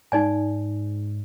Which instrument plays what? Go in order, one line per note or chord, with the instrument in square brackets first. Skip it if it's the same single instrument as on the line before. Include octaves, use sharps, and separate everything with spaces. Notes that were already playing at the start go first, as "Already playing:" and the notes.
[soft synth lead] G#2 [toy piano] D#4 D5 G#5